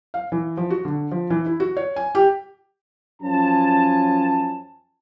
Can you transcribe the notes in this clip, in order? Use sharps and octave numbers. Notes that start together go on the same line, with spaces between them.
F5
E3
F3
F#4
D3
F3
E3
E4
F#4
C#5
G#5
G4
F#2 F3 C#4 G#5 A5